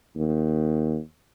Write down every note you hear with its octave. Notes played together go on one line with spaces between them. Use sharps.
D#2